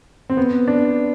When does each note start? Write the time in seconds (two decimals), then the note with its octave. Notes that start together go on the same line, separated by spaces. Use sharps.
0.30 C4
0.37 B3
0.68 D4